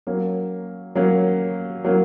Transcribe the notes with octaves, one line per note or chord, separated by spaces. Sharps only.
F#3 A#3 C#4
F#3 A#3 C#4
F#3 A#3 C#4